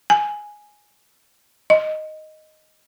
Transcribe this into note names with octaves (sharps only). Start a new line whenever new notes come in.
G#5
D#5